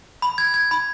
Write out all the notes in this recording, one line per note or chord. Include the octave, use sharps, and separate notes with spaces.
B5
G#6
G#6
B5